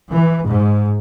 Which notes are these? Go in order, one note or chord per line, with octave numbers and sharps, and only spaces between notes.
E3
G#2